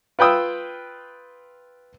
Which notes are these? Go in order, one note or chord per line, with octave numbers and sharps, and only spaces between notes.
F4 B4 G5 D#6 E6